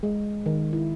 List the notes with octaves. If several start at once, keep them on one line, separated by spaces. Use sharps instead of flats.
G#3
D#3
E4